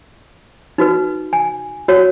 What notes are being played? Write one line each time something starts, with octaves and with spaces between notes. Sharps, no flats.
D#4 F#4 B4
G#5
F#4 C#5